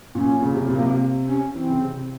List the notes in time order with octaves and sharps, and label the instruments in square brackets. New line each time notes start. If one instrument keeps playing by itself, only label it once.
[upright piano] A#2 [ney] C#4
[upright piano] C#3
C3
[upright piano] A#2 [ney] A#3
[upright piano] C3
[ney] C4
C#4
[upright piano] E3 [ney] C4
[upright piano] C#3
C3